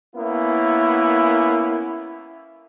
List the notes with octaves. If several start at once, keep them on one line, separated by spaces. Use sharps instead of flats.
A#3 B3 C#4 E4